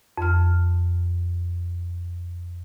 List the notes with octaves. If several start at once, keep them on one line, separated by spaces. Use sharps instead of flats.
F2 F6